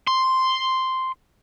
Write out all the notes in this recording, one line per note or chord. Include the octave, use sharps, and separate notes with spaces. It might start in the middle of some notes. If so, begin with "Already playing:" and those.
C6